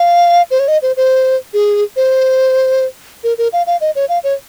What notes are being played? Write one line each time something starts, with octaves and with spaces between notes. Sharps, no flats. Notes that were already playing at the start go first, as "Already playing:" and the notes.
Already playing: F5
C5
C#5
D#5
C5
C5
G#4
C5
A#4
A#4
F5
F5
D#5
C#5
F5
C#5